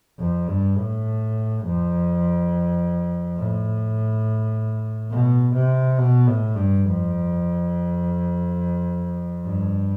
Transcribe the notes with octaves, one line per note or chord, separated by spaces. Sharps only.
F2
G2
A2
F2
A2
B2
C3
B2
A2
G2
F2
G2